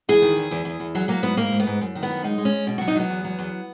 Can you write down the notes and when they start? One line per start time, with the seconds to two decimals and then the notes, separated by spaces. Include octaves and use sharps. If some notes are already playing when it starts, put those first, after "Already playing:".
0.09 E2 G#4
0.22 D#3
0.36 E2
0.51 E2
0.65 E2
0.80 E2
0.95 F#3 G#4
1.08 F#3 A#3
1.23 G#2 B3
1.37 G#2 A#3
1.52 G#2
1.60 B3
1.67 G#2
1.81 F#2
1.95 D#3
2.03 B3
2.10 F#2
2.24 G#3 D#4
2.38 G#3
2.45 C#4
2.52 G#3
2.67 B2
2.78 F#3 F#4
2.88 D#4
2.96 F#3 B3
3.10 E2
3.24 F#3
3.39 E2